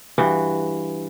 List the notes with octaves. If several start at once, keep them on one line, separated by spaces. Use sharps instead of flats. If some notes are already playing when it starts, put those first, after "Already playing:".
G2 E3 F#4